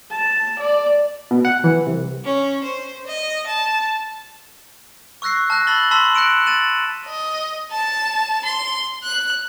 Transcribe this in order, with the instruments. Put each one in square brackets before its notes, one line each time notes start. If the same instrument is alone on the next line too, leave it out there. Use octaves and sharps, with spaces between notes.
[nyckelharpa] A5
D5
[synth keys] B2
F#5
E3
C2
[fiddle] C#4
C5
D#5
A5
[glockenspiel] C#6 E6 F#6 A#6 C7
A5 F6 F#6 A#6
B5 E6 A6 A#6 F#7 G7
A5 B5 C6 E6 B6 F#7
F#6 A#6 C#7 D7 E7 F#7
A6 D#7 E7 F#7
[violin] D#5
A5
C6
F#6